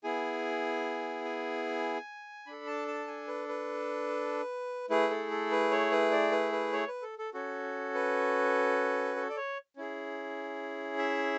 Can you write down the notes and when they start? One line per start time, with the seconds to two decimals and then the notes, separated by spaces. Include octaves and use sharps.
0.04 B3 E4 G#4 G#5
1.25 G#5
2.46 D4 A4 B5
2.67 A5
2.88 A5
3.07 G#5
3.28 B4
3.48 B4
4.90 A3 E4 G#4 B4
5.10 A4
5.31 A4
5.51 B4
5.71 C#5
5.92 B4
6.11 D5
6.32 B4
6.52 B4
6.73 C#5
6.88 B4
7.02 A4
7.19 A4
7.34 C#4 F#4 A4
7.95 B4
9.16 A4
9.29 D5
9.36 C#5
9.76 C#4 E4 G#4
10.98 E5